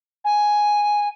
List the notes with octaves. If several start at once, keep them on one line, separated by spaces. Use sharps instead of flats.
G#5